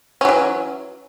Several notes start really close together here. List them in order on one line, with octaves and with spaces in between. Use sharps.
C#4 F#3 E3